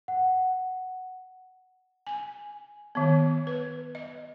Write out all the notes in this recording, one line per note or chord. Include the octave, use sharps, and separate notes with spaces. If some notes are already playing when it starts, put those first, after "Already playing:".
F#5
G#5
D#3 B3
B4
D#5